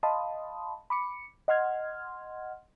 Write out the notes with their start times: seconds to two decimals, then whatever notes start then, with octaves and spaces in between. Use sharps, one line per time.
0.03 D#5 F5 A5 B5 C6 D#6
0.90 B5 D6 C#7
1.48 D#5 F#5 C6 F6 G#6